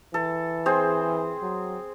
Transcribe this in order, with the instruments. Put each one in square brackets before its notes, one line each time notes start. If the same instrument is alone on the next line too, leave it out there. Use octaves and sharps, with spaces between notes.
[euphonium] E3 [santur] A4
[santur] C4 G#4 C5
[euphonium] F#3